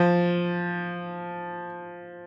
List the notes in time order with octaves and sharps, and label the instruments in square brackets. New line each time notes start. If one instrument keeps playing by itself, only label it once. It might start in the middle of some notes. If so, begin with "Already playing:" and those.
Already playing: [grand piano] F3